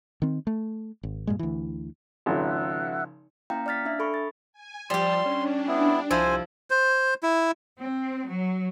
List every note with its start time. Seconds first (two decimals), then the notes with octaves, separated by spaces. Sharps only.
0.22 D#3 C4
0.47 A3
1.03 G#1
1.27 G2 A#2 G#3
1.39 D2 E3
2.26 G#1 C#3 F3 A#4 E5 F#5
3.50 A#3 C#4 E4 F5 G5 A#5
3.66 D5 F5 F6 A6 B6
3.86 D4 E5
3.99 A4 B5 C#6
4.14 A6
4.53 G#5
4.90 F3 G3 G4 A5 C6 E6
5.26 C#4 D4
5.68 B3 E4
6.11 C2 F3 E4 C5 G#5
6.70 C5
7.23 E4
7.81 C4
8.27 F#3